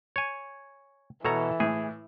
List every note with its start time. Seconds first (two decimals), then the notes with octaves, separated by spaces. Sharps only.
0.16 C#5 G#5
1.25 B2 E3 A4 C#5 A#5
1.60 A2 G#4